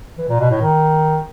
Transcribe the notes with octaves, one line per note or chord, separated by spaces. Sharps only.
E3
A#2
B2
A2
D#3